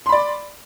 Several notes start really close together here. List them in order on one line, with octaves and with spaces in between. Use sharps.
C6 B5 D5